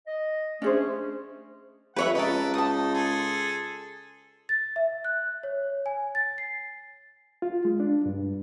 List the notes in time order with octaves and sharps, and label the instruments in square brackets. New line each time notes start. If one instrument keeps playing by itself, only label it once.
[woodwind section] D#5
[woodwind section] A3 C#4 [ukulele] D4 G#4 C5
[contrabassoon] F2 [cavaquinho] B4 C#5 E5 [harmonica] F#5
[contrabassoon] C#2 [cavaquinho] A#4 D#5 [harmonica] B4 A5
[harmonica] D#4 [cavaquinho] A5 D#6
[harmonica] G#4 A4 C6
[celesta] A6
E5
F#6
C#5
G#5
A6
C7
[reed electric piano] F4
G#3
D4
G2